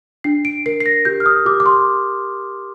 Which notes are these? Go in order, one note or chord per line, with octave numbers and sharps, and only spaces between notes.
D4 C7
D7
A#4 C7
C7
A#6
G4 G6
F6
D#6
G4 D6
D6
C6